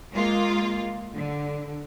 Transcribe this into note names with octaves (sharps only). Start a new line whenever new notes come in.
G#3 A#3 F4
D3